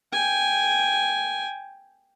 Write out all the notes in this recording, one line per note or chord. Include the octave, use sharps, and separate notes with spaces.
G5 G#5